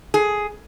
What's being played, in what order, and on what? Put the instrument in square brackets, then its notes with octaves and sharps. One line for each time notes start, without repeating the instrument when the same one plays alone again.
[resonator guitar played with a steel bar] G#4